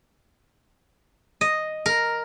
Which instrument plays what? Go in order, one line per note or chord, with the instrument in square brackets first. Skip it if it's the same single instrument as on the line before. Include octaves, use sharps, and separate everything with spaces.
[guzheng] D#5
A#4